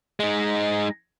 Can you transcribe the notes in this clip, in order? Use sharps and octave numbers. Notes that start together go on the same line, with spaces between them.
G#3 D#4